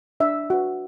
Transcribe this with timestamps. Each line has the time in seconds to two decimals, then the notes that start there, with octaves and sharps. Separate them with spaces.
0.20 D4 E5
0.50 F#4 B4